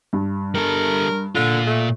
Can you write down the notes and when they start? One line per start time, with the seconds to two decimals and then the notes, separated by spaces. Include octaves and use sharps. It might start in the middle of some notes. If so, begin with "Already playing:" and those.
0.13 G2
0.55 G3 A4 A#4
1.35 A#2 D3 F4
1.66 A3